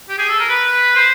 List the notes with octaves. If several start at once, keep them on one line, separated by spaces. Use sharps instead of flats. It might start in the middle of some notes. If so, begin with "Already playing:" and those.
G4
G#4
A4
A#4
B4
C5